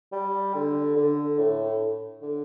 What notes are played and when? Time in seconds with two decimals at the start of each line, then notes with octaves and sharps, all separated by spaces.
0.12 G3
0.54 D3
0.96 D3
1.38 A2
2.22 D3